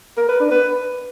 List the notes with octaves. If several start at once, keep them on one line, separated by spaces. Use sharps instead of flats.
A#4
B4
D4
B4